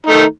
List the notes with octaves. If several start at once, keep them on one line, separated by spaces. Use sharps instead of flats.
D#3 A3 D#4